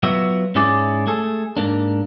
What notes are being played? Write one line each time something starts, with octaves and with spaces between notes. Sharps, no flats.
F#3 B3 F4 F#4 E5
G#2 C#4 E4 G#4 D5
A3 G#4 A4
G#2 A#3 D4